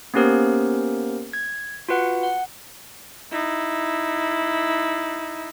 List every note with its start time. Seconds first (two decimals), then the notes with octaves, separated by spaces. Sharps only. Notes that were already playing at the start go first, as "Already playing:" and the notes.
0.14 A#3 B3 C#4 G4 A#4 C5
1.33 G#6
1.89 F4 F#4 B4 F#5
2.23 F#5
3.31 D#4 E4